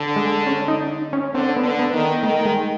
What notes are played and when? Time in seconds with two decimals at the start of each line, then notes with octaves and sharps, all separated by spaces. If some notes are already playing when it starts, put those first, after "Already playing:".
Already playing: D3
0.16 G#3
0.47 C#4
0.68 D#4
1.13 C#4
1.34 D3 C4
1.56 B3
1.64 D3
1.79 B3
1.93 D#3
2.23 D#3 A3
2.45 G#3